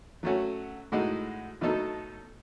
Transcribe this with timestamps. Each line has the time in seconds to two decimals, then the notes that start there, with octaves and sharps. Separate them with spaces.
0.23 F#3 A3 C#4 F#4
0.92 A2 G#3 D#4 F#4
1.61 B2 F#3 A3 D#4 A4